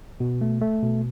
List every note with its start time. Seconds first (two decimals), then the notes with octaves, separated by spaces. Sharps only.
0.20 B2
0.41 A3
0.61 A3
0.83 B2